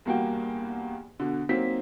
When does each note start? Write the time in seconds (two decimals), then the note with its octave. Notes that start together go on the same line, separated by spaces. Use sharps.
0.05 E2 G2 A#3 F#4 G5
1.19 B2 D3
1.49 F#3 A#3 C4 D#4 B6